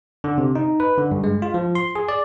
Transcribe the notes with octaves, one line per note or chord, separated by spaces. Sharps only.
D3
C3
D#4
B4
D3
G2
G#3
F4
F3
C6
G#4
D5